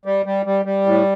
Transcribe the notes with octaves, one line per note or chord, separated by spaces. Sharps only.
G3
G3
G3
G3
A2